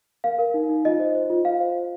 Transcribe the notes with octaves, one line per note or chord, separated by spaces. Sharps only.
A#4 F5
A#4
D#4
D#4
F4 D#5
C5
C5
F4
F4 F5
C5
C5